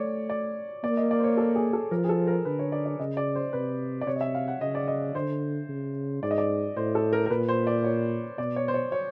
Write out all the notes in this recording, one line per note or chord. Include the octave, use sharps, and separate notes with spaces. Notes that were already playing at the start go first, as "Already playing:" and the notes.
Already playing: A3 C#5 D5
D5
A#3 D5
D#5
D5
C5
C#5
A4
G#4
A4
F3 A#4
G#4
A4
A#4
D3 B4
C#5
D5
D5
C#3 D#5
D5
C5
C3 B4
D5
C3 C#5
D#5
E5
F5
F#5
C#3 D#5
D5
D#5
D3 C5
C#3
G#2 D5
D#5
D5
A2 C5
A4
A#4
A#4
A#2 B4
C5
D5
C#5
B2 D5
C#5
C5
C#5
C#5